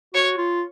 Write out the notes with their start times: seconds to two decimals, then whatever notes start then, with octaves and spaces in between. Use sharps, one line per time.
0.14 F#4 C#5
0.38 F4